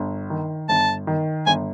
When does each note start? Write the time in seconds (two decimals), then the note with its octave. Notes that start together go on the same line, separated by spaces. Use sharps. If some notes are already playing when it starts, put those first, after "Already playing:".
Already playing: G1
0.30 D#3
0.69 G1 A5
1.07 D#3
1.46 G1 G#5